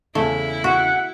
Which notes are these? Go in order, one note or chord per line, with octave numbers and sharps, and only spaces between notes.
E2 C#3 A3 E4
F#4 F#5